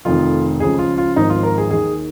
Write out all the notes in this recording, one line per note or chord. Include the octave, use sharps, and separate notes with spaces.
F1 F2 D#3 F4
C#2 C#3 F3 G#4
F4
F4
G#1 G#2 F3 D#4
F4
A#4
G#4
D#2 D#3 G#4